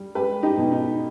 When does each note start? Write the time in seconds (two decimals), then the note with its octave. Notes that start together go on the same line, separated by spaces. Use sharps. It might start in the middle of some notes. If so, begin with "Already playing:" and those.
Already playing: G3
0.15 G#3 G4 B4
0.43 D#4 G4
0.57 B2
0.71 D#4